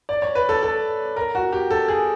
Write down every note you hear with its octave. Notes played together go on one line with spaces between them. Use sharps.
D5
C#5
B4
A4
A4
A#4
F#4
G4
A4
G#4